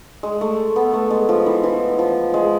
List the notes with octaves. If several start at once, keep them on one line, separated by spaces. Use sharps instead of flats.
G#3
A3
B3
A3
G#3
F3
E3
E3
F3
G#3